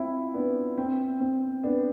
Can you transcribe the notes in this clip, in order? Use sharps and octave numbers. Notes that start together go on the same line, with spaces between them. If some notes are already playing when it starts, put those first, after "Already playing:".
Already playing: C4 E4 F4
B3 D4
C4
C4
B3 D4